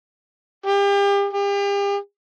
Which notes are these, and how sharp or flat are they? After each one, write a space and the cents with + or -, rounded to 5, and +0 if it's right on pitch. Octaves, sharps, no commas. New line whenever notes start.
G4 +35
G4 +40